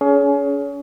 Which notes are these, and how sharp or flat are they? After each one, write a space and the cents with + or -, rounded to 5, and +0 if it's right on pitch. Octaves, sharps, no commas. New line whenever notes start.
C#4 +30 G#4 +25